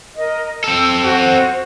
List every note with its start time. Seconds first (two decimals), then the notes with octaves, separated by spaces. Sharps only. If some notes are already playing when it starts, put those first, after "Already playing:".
0.17 A#4 D#5
0.64 C4 A4 E6
1.04 F#4 C5